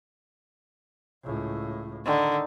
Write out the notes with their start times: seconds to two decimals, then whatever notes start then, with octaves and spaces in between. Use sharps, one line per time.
1.23 C#2 A2
2.06 D3 D#3 D#4